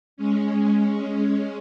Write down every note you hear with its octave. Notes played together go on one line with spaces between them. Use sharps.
G#3 C#4